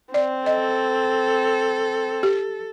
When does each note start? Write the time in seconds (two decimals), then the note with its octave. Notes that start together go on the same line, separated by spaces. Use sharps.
0.14 C4 D5
0.46 A4 D#5
2.23 G4